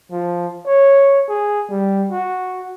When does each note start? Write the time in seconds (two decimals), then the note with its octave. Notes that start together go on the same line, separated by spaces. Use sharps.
0.11 F3
0.66 C#5
1.28 G#4
1.70 G3
2.11 F#4